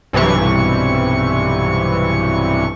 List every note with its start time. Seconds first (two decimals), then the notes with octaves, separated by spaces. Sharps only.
0.13 B1 G2 C3 E3 C#6